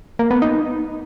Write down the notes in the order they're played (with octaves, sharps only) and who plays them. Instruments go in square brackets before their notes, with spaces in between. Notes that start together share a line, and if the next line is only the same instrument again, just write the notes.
[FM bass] A#3
B3
D#4